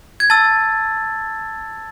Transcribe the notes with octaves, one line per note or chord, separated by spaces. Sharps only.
G#6
A5 E6 A6